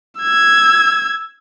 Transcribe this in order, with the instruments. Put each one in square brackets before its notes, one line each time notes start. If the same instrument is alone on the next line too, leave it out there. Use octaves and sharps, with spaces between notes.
[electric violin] E6 G#6